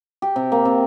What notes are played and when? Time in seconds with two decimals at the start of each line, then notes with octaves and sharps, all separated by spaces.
0.22 G4
0.36 C3
0.52 A#3
0.65 C3